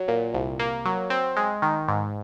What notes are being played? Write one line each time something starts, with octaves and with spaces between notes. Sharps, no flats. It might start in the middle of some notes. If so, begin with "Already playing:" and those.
Already playing: F#3
A#2
C2
A#3
F#3
C4
G#3
D#3
G#2